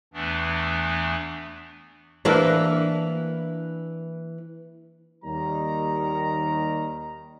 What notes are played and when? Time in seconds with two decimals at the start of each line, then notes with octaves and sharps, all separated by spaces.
0.14 E2 E3 A3 B3 D4
2.25 E3 A#3 D4
5.25 D#2 D#3 G3 A#5